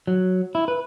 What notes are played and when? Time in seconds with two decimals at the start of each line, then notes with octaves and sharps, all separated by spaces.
0.07 F#3
0.55 E4
0.68 B4